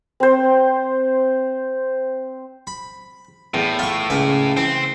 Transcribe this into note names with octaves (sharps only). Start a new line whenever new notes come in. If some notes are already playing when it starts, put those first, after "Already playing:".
C4 C5
B5
E2 A2
F4 C#6
C#2 A#3 G#5
E3 C4